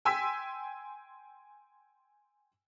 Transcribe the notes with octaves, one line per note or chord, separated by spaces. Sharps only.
G5 G#5 C6 E6 B6